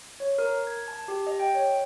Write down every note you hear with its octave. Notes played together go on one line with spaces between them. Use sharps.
C#5
A#4
G#6
A5
G4
D#5
G5
C#5